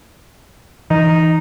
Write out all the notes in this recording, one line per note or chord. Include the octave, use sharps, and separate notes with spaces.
E3 D#4